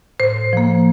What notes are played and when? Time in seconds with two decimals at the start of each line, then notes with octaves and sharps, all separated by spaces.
0.20 A2 C5
0.53 F3 A#3